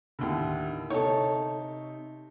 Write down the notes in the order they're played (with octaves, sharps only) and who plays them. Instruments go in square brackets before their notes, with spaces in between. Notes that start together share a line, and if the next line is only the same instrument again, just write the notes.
[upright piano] D#2 A2 D3
[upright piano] C3 D#4 [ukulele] A4 C#5